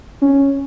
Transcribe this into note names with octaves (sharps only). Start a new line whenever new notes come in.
C#4